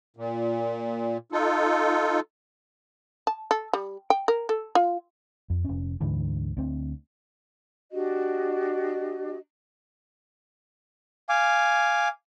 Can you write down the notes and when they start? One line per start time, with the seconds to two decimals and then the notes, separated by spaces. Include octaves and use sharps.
0.17 A#2
1.32 D#4 F4 A4
3.27 A5
3.51 A4
3.73 G3
4.10 G5
4.28 A#4
4.49 A4
4.75 F4
5.50 F2
5.65 F1 C#4
6.01 D2 G#2 D3 E3
6.57 D2 C4
7.93 D4 F#4 G4 D#5
11.29 F5 G#5 D6